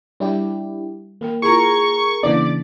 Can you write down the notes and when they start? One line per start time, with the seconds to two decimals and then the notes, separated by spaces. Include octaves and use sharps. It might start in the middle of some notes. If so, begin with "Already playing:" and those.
0.20 G3 D4 E4 G4
1.21 D#3 A#3 A#4 G5
1.42 E4 F4 G#4 A#4 C#6
2.23 C#3 E3 A#3 B3 D4 D5